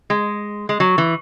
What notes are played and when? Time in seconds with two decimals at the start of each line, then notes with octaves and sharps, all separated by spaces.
0.10 G#3
0.69 G#3
0.80 F#3
0.98 E3